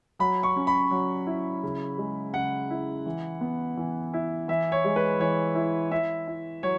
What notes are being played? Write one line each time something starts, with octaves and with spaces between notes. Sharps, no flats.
F#3 B5
C#6
C#4
B5
F#3
E4
C#3
G#3
C#3 F#5
E4
E3
B3
E3
E4
E3 E5
C#5
G#3
B4
E3 C#5
E4
E4 E5
E4
F#3 C#5